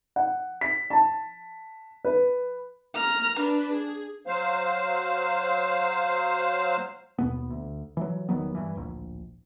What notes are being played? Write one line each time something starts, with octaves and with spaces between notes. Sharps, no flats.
F#5
B6
A5
B4
A#5 F6
D4 B4
G#4
F#3 C5 F5
D#2 B2 B3
D2
E3 F#3
E1 D#3 F#3 B3
G2 E3
D1 A#1